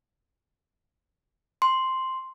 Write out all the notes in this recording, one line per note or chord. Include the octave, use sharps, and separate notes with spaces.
C6